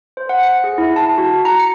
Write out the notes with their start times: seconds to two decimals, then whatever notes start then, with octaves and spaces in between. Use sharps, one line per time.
0.17 C5
0.29 F#5
0.43 C#7
0.64 G#4
0.78 E4
0.96 A5
1.18 F#4
1.45 A#5
1.60 C#7